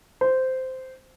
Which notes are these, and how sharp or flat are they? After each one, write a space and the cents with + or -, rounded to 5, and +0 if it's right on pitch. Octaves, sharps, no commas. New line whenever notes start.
C5 -10